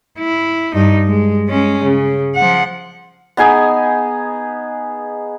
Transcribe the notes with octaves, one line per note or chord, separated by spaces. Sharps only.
E4
G2 D#4
G#3
G#3 C#4
C#3
F3 F#5
B3 D#4 G#4 G#5